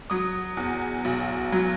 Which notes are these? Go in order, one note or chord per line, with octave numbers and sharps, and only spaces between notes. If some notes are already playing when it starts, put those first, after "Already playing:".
F#3 D#6
E2
B1
F#3